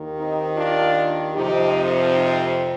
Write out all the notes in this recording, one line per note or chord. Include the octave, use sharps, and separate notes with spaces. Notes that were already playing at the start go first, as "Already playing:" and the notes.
Already playing: D#2 D#3
C4 D#4
D4 F4
F2 C3 F3 D#4 G4
D#4 G4